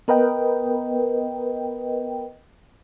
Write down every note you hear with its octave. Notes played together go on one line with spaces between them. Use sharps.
B3 A#4 B4 D#5 G5